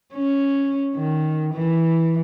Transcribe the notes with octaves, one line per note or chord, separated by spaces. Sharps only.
C#4
D#3
E3